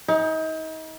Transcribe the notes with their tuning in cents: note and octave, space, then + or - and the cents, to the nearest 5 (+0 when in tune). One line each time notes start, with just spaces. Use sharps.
D#4 +35 G#4 +0